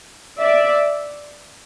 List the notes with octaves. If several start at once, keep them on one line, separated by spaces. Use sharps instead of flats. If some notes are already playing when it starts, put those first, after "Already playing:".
D5 E5